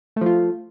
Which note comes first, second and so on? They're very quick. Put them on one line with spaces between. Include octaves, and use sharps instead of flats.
A3 F3 F4